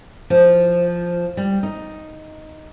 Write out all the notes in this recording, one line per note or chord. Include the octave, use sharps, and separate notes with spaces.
F3
G3
D#4